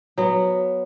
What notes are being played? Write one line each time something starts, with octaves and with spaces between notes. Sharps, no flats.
F#3 B3